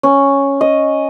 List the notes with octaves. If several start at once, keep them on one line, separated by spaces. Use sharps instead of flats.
C#4
D#5